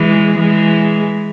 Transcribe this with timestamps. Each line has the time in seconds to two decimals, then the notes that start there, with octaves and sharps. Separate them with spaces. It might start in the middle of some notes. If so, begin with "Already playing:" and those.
Already playing: E3 G#3
0.38 E3 G#3